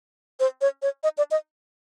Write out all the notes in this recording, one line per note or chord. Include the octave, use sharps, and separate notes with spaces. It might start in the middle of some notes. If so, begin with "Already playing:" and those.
C5
C#5
C#5
D#5
D5
D#5